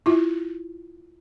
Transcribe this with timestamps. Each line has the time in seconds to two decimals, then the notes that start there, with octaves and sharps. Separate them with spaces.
0.06 E4 F4